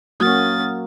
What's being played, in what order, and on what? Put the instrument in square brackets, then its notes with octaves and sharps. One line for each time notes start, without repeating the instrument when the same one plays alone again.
[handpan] F#3 A#3 F#4 [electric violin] C#4 A6 [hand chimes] D#6 F6